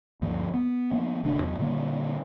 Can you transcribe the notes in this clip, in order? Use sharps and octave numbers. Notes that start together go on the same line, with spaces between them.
D2 G2 F3 A#3
B3
F3 A#3 B3
D1 D2 C3 D4
E2 F#3
A#2 D3 G3 A#3